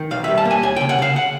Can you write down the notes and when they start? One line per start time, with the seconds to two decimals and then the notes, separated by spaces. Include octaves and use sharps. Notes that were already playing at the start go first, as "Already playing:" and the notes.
Already playing: D#3
0.11 B1 F5
0.24 G3 E5
0.38 A5
0.45 A#3
0.51 G#5
0.63 D#2 G#5
0.76 C#3 G5
0.89 F#5
0.99 C#3 F5
1.16 F#5